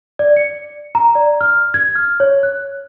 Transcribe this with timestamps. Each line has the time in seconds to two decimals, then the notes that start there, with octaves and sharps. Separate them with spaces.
0.19 D5
0.36 C#7
0.95 A#5
1.15 D5
1.41 F6
1.74 G#6
1.95 F6
2.20 C#5
2.43 F#6